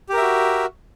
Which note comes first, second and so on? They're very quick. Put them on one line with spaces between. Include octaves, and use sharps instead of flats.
G4 A#4 E5 F#4